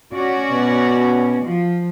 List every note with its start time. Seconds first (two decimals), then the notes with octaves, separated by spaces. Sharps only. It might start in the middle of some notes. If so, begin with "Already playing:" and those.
0.13 C#4 F#4 D5
0.51 B2
1.43 F3